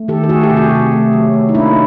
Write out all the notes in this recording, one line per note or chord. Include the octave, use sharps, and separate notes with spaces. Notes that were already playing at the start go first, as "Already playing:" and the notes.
Already playing: A3
D#3 G4 A4
A4
A3 F#4 G#4
G4 A4
C3
F#4 G#4
C3
A3
F#3
A3
D#4
A#3 D4 E4